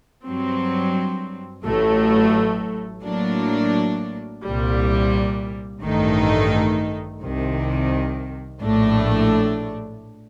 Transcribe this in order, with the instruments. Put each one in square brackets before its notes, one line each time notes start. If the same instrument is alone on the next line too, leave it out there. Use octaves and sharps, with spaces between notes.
[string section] G2 F#3 C4
A1 A2 F#3 A3
A2 F#3 A#3 D4
C2 A#2 G3
A1 G2 D#3 A3 D#4
C2 C3 D#3
A#1 A2 A3 D4